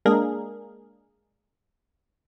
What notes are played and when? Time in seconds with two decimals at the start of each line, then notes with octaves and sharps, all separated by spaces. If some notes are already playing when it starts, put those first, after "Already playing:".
0.05 G#3 A#3 D4 G#4 A#4